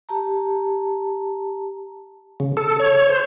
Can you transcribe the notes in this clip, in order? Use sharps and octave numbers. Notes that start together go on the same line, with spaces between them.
G4 A5 A#5
C#3
A4
C#5
C5